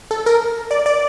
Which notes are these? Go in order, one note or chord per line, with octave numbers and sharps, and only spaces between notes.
A4
A#4
D5
D5